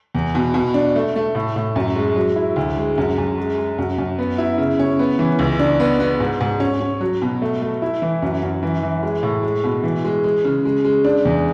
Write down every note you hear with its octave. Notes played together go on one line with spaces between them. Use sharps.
E2
B2
B2
D4
A3
A3
A2
A2
F#2
G#3
F#3
E4
D2
G#3
F#2
F#2
G#3
G#3
F#2
F#2
B3
E4
C#3
C#4
B3
E3
C#2
D4
B3
B3
G#2
G#2
C#4
C#4
F#3
B2
A3
A3
E4
E3
F#2
F#2
E3
E3
G#3
A2
G#3
B2
E3
G#3
G#3
C#3
G#3
G#3
D4
E2